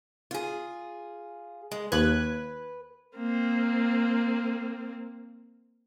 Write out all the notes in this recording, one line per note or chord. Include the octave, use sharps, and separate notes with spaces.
F4 G#4
G#3
D#2 B4 F#6 G#6
A#3 C4